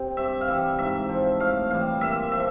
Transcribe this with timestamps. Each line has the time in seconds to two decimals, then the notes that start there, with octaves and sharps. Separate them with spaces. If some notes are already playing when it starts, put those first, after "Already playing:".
Already playing: C3
0.17 G2 E5
0.41 F5
0.48 E3 G3 E5
0.78 G#2 E5
1.09 F3
1.40 A2 F5
1.70 E3 G3 F5
2.01 A#2 E5
2.32 F3 E5